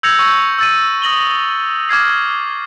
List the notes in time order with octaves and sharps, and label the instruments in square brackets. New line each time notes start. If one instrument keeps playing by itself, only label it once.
[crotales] E6 G6 G#6 A#6 C#7 F7
C#6 G6
E6 A6 D#7
D#6 A#6 F#7 G7
D6 F6 G#6 C7